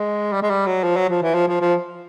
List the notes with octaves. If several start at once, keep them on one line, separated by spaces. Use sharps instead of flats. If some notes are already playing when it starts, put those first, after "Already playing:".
Already playing: G#3
G3
G#3
G3
F#3
F3
F#3
F3
E3
F3
F3
F3